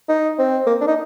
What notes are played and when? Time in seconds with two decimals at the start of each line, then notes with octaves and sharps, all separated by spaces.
0.09 D#4
0.38 C4
0.67 A#3
0.81 D4
0.87 D#4